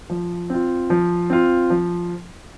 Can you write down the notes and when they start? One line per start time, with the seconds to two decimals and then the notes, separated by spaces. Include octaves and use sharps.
0.10 F3
0.50 C4 F4
0.90 F3
1.30 C4 F4
1.70 F3